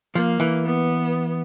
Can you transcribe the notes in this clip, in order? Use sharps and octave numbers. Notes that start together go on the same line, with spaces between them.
F3 A#3
E3
B3